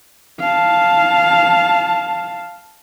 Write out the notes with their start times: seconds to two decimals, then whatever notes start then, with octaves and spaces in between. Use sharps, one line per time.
0.40 F5 A5